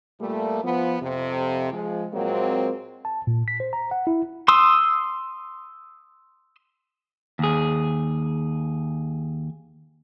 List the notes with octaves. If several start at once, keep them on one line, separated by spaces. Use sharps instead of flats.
A#2 G3 A3
F3 B3
F2 C3
F3 G#3
A#2 F#3 G#3 A#3 C4
A5
A#2
B6
C5
A#5
F#5
E4
C6 D#6 E6
D#2 G#4